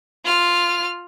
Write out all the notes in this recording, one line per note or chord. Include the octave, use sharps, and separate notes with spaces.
F4 F6